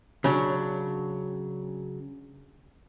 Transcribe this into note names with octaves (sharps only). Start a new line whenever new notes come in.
C#3 F#3 D4